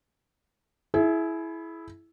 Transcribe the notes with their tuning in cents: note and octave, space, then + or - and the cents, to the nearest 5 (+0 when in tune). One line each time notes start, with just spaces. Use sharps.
E4 +0 G#4 +35